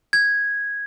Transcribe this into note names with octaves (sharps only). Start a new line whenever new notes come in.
G#6